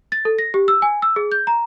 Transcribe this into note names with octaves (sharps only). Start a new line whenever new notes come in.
A6
A4
A#6
G4
E6
G#5
E6
G#4
G6
A#5